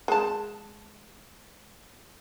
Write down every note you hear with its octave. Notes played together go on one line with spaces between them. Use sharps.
G#3 A5